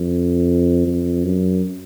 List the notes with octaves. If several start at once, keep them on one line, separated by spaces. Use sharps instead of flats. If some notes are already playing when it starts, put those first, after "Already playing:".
Already playing: F2
F2
F#2